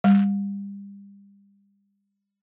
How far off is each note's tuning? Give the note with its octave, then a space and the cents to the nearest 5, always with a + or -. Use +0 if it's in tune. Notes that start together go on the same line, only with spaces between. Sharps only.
G3 +30